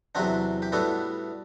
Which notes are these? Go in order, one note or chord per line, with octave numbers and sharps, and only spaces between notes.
E2 C3 F#3 C4 D4 F#4
G4
A2 G3 B3 D4 F#4 A4